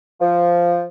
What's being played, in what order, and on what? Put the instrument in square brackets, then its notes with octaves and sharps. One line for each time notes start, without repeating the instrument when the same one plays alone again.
[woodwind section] F3